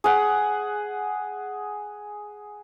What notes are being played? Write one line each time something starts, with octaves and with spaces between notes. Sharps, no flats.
G#4 F#5